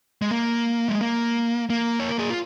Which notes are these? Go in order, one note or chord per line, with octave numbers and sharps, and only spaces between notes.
G#3
A#3
G#3
A#3
A#3
C#5
A#4
G#4
F4